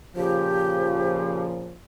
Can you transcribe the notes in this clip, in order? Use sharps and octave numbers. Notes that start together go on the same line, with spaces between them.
A#2 C#3 F3 G4